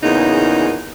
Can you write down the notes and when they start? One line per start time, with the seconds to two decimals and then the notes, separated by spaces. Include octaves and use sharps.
0.03 E2 A#2 C#3 D#4